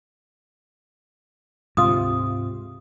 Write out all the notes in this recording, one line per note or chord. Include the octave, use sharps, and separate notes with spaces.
D2 G#2 C3 F4 D#6